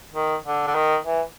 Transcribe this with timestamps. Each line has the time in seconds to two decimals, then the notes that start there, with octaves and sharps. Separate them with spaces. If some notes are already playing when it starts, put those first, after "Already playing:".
0.14 D#3
0.45 D3
0.67 D3
0.75 D#3
1.05 E3